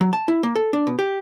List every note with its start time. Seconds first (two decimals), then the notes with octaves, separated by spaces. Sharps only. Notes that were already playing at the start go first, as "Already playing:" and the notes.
0.01 F#3
0.13 A5
0.28 E4
0.43 A#3
0.56 A4
0.73 D4
0.87 B2
0.99 G4